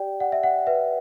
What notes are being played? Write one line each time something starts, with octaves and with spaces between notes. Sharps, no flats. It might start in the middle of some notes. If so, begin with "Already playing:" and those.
Already playing: G4 D5 G5
D5 F#5
E5
F#5
B4 E5